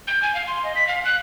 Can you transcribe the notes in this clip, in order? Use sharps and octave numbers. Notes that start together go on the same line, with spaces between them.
G6
G#5
F5
C6
D#5
B6
F5
F#6